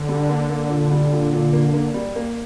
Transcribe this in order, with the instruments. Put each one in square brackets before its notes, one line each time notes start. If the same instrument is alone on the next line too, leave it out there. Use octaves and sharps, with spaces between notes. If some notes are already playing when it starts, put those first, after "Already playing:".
Already playing: [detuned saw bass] D3
[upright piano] G3
A#3
A#3
A#2
G3
A#2
A#2
A#3
A#3
G3
A#3